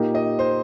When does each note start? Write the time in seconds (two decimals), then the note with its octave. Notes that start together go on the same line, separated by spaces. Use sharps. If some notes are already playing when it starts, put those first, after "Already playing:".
Already playing: A#2 A#3 D#4 G4
0.15 D#5
0.39 C5